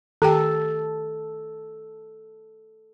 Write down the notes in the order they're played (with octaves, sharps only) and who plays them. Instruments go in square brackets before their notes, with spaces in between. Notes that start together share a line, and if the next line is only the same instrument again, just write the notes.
[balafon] D#3 G4 G5 [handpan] A4